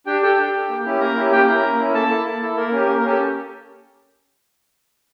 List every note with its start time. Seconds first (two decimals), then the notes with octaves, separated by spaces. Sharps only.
0.06 D4 G4 G5
0.22 G4 A4 G5
0.38 D4
0.54 A4
0.69 A#3
0.84 C#4 E4 G4
1.00 A#3 A#4 A#5
1.16 C#4 E4 G4
1.31 A#3 G4 G5
1.47 C#4 E4 A#4 A#5
1.63 A#3
1.78 C#4 E4
1.94 A#3 A4 A5
2.10 E4 A4
2.26 A#3
2.41 E4 A4
2.56 A#3 A#4
2.72 C#4 G4
2.87 A#3 A#4
2.98 A#4
3.04 C#4 G4 A4